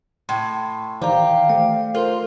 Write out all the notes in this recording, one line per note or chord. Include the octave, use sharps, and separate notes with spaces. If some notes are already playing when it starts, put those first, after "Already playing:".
A2 C6
D#3 E3 G4 C5 D5 F5 A#5
A3 G5
F4 A4 A#4 C5